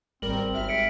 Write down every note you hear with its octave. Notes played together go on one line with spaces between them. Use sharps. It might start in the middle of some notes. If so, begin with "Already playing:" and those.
G#1 G3 C4 A#4 F#7
G#1 E5 F6
B6 C#7 D7